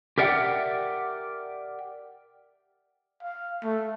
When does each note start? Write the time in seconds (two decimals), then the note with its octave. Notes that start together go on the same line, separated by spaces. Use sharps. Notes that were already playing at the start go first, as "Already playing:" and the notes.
0.18 G4 A#4 D5 E5 F#5 G5
3.23 F5
3.64 A3